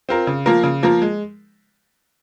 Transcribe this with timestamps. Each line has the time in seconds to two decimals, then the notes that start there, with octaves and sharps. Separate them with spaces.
0.09 C4 F4 A#4
0.27 C#3
0.46 F3 A#3 F4 A#4
0.63 C#3
0.83 F3 A#3 F4 A#4
1.02 G#3